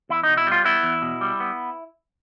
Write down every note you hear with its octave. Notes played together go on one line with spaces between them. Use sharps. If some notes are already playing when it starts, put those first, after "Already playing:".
E2 E4
B2 D#4
E4
G3 F4
B3 E4
E2
B2
G3
B3